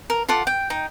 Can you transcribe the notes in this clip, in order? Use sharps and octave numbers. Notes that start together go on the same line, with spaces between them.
A#4
F4 A4 F#5 D6
G5
D#4 G5